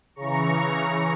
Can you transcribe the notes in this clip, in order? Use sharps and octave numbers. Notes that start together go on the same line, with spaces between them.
C#3 E3 A#5 C#6